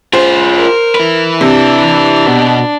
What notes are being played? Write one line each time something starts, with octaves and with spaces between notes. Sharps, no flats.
F4 G#4 C5
A#4
E4 B4
C3 D4
B2